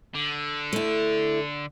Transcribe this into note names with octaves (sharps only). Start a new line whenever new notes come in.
D3
A3 E4